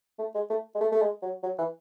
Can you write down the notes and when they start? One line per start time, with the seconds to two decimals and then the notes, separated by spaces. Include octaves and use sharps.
0.19 A3
0.35 G#3
0.50 A3
0.75 G#3
0.81 A3
0.92 A3
1.02 G#3
1.22 F#3
1.43 F#3
1.59 E3